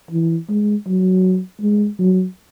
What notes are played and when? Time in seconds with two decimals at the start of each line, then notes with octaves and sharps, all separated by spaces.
0.11 E3
0.49 G#3
0.87 F#3
1.61 G#3
1.98 F#3